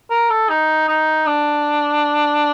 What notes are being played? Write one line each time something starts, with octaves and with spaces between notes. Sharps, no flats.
A#4
A4
D#4
D#4
D4